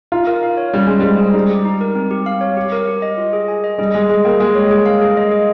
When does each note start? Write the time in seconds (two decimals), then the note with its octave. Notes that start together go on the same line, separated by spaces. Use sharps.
0.12 D#4 F4
0.27 A#4
0.43 F5
0.57 C#5
0.73 G3 C#4
0.87 G#3 F4
1.00 G3 C5
1.19 G#4
1.34 G3 D#4
1.50 G4
1.65 D#4
1.81 A#4
1.95 C4
2.11 G4
2.26 F5
2.41 C#5
2.57 G4
2.72 A#4
2.88 G4
3.02 D#5
3.18 F4
3.33 G#4
3.48 G#5
3.64 D#5
3.78 G3 G#4
3.94 G#3 D#5
4.09 G#3 G#4
4.25 A#3 G5
4.40 G#3 G#4
4.55 C#5
4.71 G#4
4.86 F5
5.02 G#4
5.17 D#5
5.31 G#4